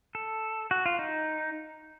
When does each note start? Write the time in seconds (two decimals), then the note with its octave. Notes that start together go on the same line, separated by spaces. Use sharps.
0.15 A4
0.71 F#4
0.86 F4
0.99 D#4